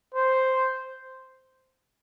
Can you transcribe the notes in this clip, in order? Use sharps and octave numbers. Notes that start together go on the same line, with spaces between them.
C5